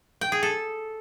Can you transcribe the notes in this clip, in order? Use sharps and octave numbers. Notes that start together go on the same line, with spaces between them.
G5
G#4
A4